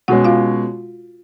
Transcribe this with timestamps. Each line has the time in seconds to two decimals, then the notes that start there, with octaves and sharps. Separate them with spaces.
0.08 B2 G#3 C#4 F#4 F#5
0.24 F4 F5